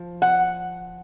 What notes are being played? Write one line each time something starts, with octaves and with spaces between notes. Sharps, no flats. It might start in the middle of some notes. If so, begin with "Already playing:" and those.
Already playing: F3
F#5